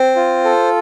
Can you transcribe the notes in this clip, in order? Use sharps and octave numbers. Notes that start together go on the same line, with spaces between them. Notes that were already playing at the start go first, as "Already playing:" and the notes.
Already playing: C4 C5
F4
A4